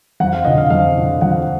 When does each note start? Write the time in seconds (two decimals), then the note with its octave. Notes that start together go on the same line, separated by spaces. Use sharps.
0.20 F2 F#5
0.33 F5
0.45 D3 F3 D#5
0.58 F5
0.70 F2 F5
0.96 D3 F3
1.21 F2 F#5